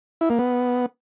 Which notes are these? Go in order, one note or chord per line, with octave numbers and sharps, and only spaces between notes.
E4
A#3
B3